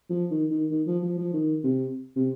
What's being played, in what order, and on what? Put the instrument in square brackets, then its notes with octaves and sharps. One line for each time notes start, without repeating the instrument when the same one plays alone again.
[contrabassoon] F3
D#3
D#3
D#3
F3
F3
F3
D#3
C3
C3